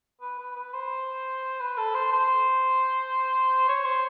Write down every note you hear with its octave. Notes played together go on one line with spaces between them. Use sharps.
B4
B4
B4
C5
B4
A4
C5
C5
C#5
C5